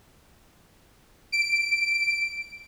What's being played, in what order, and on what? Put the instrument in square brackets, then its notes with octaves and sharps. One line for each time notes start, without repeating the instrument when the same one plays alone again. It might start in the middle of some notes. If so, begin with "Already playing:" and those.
[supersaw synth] D7